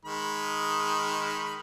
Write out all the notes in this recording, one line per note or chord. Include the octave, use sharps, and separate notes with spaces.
D#3 G#3 B5